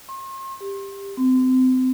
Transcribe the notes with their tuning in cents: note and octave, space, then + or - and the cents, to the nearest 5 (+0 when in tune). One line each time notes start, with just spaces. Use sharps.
C6 +40
G4 +15
C4 -30